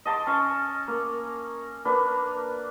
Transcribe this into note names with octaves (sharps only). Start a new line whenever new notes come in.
D#5 A5 C6 D6
C#4 A5 C#6
A#3
A#3 D4 B4